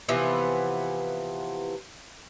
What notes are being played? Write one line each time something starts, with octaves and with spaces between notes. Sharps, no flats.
C3 E3 F3 B3